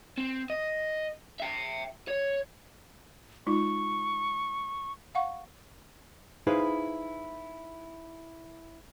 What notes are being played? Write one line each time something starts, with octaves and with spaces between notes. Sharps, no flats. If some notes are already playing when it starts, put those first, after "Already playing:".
C4
D#5
E5 G5
C#5
G#3 D#4 F4 C#6
F5 F#5 C#6
D#4 E4 G#4 B4 C5 F5